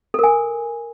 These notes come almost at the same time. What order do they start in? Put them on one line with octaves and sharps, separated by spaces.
A4 A#4 G#5